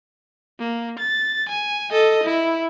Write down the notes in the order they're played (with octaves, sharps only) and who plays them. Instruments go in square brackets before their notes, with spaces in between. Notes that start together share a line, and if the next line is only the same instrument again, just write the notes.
[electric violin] A#3
A6
G#5
A4 D#5
E4